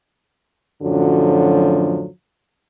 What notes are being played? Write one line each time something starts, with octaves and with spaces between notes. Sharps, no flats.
F#2 A2 D3 F3 F#3